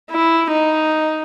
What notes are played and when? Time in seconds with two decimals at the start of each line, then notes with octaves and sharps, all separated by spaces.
0.11 E4
0.52 D#4